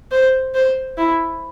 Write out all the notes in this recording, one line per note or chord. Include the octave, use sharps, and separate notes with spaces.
C5
C5
E4